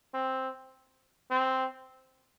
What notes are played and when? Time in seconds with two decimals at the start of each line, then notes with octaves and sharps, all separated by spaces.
0.14 C4
1.31 C4